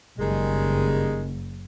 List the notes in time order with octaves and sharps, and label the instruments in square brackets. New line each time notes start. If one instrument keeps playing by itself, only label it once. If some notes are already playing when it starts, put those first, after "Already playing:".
[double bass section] F#1 [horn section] D#3 G3 G#3